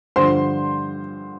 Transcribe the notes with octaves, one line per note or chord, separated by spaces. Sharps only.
G2 D3 F3 C5 C6